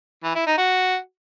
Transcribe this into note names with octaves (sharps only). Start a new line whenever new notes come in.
E3
E4
D#4
F#4